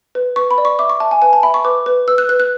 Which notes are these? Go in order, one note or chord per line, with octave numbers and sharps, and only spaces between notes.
B4
B4 C#6
B5
D5
C#6
E5 D6
C#6
E5 A5
G#5
B4 G#5
A5
E5 B5
C#6
B4 D6
B4
B4 E6
F#6
B4 F#6
F#6